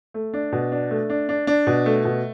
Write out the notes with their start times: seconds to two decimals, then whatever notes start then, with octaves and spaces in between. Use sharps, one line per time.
0.14 A3
0.34 D4
0.52 B2
0.72 D4
0.91 A3
1.10 D4
1.29 D4
1.47 D4
1.67 B2
1.86 A3
2.05 B2